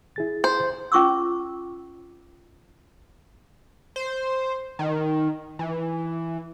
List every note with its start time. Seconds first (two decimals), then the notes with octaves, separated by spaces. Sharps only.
0.16 E4 G#4 A6
0.44 C5
0.92 C#4 F4 C#6 D6 E6
3.96 C5
4.79 D#3
5.59 E3